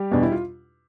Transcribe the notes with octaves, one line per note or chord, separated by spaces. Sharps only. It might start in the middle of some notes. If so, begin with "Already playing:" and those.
Already playing: G3 G4
E2 B2 D4
E4
F4